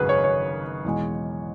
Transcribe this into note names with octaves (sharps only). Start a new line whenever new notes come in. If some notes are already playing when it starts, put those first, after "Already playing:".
Already playing: G#1 F#2 C#3 F#4 G#4 B4
C#5
C#5
E2 B2 G#3